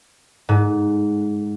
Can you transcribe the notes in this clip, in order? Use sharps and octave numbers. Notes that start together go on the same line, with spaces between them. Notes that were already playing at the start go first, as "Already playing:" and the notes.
G#2